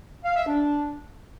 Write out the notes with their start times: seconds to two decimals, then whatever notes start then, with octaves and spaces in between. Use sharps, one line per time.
0.25 F5
0.36 E5
0.47 D4